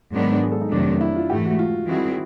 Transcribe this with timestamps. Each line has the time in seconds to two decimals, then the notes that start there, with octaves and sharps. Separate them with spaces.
0.13 G#2 D#3 F#3 B3 D4
0.42 G#4
0.52 A4
0.61 D#4
0.72 F2 C3 D#3 F#3 A3 D4
1.01 E4
1.16 F4
1.30 G#2 E3 A3 G4
1.45 F#4
1.59 F4
1.88 D#3 G3 C4 E4 F#4 G#4